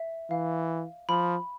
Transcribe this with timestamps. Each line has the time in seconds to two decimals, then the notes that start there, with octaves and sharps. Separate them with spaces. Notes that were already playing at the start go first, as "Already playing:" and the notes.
Already playing: E5
0.31 E3 F5
1.09 F3 B5